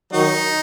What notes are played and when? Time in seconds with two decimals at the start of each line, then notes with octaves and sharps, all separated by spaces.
0.12 D#3 F#3 D#4